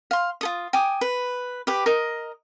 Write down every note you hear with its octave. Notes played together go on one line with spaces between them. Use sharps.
F5 C6
F4 A4 D#6
G5 G#5 D6 D#6
B4
G4 B4 D6
A#4 D#5